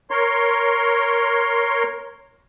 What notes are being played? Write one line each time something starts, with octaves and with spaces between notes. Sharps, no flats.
A#4 C#5 C6